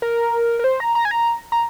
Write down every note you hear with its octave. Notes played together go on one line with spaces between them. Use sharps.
A#4
A#4
C5
A#5
A#5
G#5
A#5
A#5